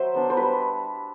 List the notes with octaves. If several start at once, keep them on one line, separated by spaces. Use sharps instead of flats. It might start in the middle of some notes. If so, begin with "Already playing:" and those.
Already playing: F#3 C5 E5
B3 D4
C5
G3 B4